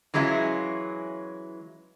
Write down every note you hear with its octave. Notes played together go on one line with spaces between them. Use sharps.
E3 F#3 G#3 C#4 E4 F4